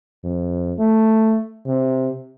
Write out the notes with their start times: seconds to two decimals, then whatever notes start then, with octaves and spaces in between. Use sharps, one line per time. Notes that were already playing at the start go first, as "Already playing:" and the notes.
0.24 F2
0.79 A3
1.67 C3